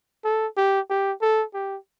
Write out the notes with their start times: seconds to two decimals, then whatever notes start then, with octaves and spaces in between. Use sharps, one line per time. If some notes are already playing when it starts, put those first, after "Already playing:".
0.24 A4
0.57 G4
0.90 G4
1.22 A4
1.54 G4